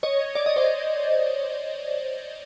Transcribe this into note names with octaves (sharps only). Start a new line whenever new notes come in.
C#5 D#5
D5
D#5
C5 D5